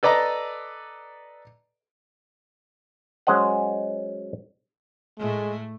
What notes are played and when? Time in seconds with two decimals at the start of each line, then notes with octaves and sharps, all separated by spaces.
0.03 A4 B4 D5 D#5 A#5
3.27 F#3 G#3 C#4 C5 D#5 F#5
5.19 A2 G#3 A3